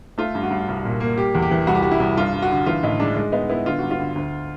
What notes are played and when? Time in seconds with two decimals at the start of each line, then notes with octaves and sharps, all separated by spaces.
0.18 A3 F4
0.35 G2
0.43 F#4
0.51 G2
0.68 C2
0.85 A#2
1.00 A#3
1.17 G3 G4
1.35 E2
1.42 G4
1.51 E3
1.67 C2 F#4
1.75 G4
1.82 G3 F#4
1.91 E4
2.00 C2
2.17 G2 F4
2.34 G2
2.42 F#4
2.51 D3
2.66 E3 F4
2.83 A2 D#4
3.00 G#3 D4
3.16 G#3 D#4
3.32 B3 D#4
3.49 B3 E4
3.66 D3 F4
3.79 G2 F#4
3.91 F4
4.00 D3
4.15 D2